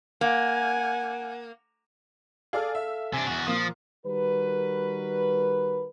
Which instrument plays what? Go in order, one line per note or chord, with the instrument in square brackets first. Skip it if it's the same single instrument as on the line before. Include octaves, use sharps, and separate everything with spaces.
[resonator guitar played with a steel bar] A#3 [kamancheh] F#5 G#5
[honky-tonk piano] G#4 D5 F6 [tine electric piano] A4 F5
[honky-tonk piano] E5
[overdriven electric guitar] C3 D4 [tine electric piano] G#5
[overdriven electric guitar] E2 F#4 [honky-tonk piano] F7
[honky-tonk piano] A#2 A#3 [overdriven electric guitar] F3 [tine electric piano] D#6
[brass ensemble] D#3 G3 F#4 A#4 B4